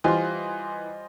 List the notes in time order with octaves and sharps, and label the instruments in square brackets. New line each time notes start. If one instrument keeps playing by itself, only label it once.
[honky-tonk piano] E3 [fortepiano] G3 F4 C5 [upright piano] D#5 C6 [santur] G#5